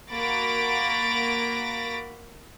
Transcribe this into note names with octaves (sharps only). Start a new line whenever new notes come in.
A#3 F#4 B5 A6 A#6 D7